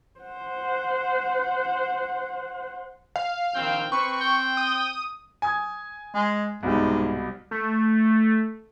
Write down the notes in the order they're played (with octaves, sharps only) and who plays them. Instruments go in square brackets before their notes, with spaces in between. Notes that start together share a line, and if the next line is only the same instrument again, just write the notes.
[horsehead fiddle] C5 F#5
[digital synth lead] F5
[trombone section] A#1 D#3 C4 [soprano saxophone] G5
[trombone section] C4 [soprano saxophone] B4 [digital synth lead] C#6
[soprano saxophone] G5
[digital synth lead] D#6
[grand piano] G#5 D#6 G#6
[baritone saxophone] G#3
[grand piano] C2 B2 G3 [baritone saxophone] G#2
[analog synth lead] A3